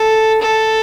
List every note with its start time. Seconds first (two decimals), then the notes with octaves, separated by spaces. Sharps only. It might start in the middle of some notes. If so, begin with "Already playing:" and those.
Already playing: A4
0.42 A4